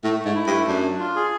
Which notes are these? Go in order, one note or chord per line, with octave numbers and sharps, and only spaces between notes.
A2 A3
A3
G#2
E4
G2
A3
F#2 D4
D4
F4
G#4